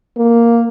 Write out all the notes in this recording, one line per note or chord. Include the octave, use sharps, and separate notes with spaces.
A#3